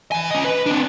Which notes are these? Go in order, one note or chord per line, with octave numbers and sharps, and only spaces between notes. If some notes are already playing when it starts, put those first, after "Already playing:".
E3 G#5
C#4 D#5
B4
C4 D4